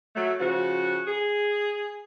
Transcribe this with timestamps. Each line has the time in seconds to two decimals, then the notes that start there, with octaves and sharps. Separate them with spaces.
0.15 F#3 A3
0.40 C#3 F3 F#4
1.07 G#4